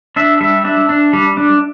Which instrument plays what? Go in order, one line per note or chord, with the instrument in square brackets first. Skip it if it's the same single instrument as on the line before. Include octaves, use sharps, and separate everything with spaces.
[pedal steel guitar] D4 E5
G3 E5
D4 E5
D4
G3
D4